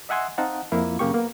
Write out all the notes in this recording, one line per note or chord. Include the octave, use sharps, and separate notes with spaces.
D#5 E5 F#5 G#5 C6 E6
C4 D#4 F5 F#5 A5
F2 A#3 E4 F5
F#2 C#3 A#3 G4 C#6
A#3 B3